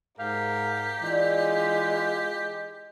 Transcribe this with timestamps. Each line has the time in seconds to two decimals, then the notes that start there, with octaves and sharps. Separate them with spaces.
0.20 G#2 G4 A#4 F5
1.02 E3 G#3 D4 F4 D5